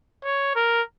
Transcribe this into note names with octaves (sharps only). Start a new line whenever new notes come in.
C#5
A#4